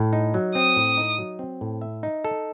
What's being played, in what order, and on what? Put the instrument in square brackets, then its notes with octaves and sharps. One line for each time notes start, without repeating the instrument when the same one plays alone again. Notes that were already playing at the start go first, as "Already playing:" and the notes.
Already playing: [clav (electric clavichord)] A2
D#4
F#3
[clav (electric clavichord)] C4 [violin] D#6
[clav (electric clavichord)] A2
D#4
F#3
C4
A2
E5
D#4
A4